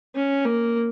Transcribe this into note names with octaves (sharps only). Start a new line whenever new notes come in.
C#4
A#3